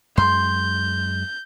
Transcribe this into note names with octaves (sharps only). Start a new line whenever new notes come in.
F#2 G#3 C6 G6